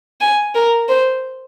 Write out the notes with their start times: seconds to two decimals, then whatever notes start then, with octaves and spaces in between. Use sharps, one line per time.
0.21 G#5
0.55 A#4
0.89 C5